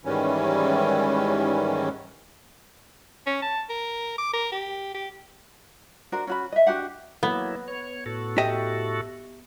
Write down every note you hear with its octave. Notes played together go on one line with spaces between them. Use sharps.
G#2 D#3 E3 G3 C#4
C#4
A5
A#4
D6
A#4
G4
G4
D4 F#4 A#4 C5
C#4 F#4 B5
D#5 E5
D4 F#4 G4 F#5
F#3 A#3 B3 E4
C#5
A2 F#4 A4
G4 D#5 E5